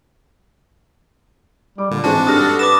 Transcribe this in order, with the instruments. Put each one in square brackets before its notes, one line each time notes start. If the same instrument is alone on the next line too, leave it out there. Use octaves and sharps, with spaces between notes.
[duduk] G3 [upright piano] D6
[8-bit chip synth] A#2 [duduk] D3
[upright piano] G#2 G#3 C4 [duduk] E3 [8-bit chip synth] D4 F#4 [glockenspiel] A5
[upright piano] G2 G4 F6 [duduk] A4 [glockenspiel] D#6 A#6
[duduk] B4 [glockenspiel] D6 D#6 E7 [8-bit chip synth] A6